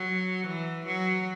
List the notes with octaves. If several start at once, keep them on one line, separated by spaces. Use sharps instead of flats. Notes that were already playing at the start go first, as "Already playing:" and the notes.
Already playing: F#3
E3
F#3